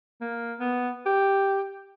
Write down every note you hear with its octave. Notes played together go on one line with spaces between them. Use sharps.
A#3
B3
G4